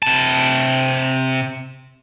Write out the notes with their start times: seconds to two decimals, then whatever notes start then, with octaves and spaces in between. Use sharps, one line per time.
0.02 C3 A5